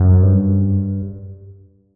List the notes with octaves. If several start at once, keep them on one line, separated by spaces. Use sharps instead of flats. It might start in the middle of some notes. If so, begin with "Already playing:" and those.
Already playing: F#2
G2